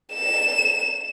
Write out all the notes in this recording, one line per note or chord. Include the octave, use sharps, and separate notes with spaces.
E7